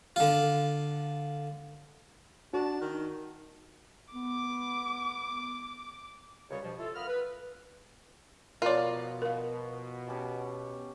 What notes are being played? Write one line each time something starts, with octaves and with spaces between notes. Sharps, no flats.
D3 F4
D4 F#4
D#3
B3 D6
C#2 F#2 C#3 G3 C#5
G2 B2 F3
E4 F4 A4
B3 F4 A#4 B5 D#6 F6
B4
B2 F3 F4 A#4 C#5 D5 A#5
A#4 F5
C#4 G4 A5